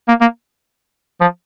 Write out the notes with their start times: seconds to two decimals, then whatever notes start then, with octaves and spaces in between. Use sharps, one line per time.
0.08 A#3
0.21 A#3
1.21 F3